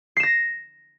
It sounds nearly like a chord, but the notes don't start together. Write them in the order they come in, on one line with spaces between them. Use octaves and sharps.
C7 E7 A#6